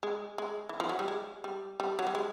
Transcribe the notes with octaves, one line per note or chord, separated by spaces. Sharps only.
G#3
G#3
E3
F3
F#3
G3
G#3
G3
G3
F#3
G3
G#3